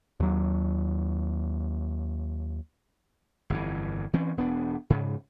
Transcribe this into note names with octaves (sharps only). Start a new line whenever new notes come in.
D#2 F#3
G1 F2 E3
E3 C4 C#4
E1 B3 D4
G#2 C#3